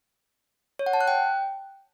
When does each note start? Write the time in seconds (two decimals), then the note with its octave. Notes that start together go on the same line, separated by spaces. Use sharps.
0.79 C#5
0.86 F#5
0.93 A5
1.01 F#6
1.08 G5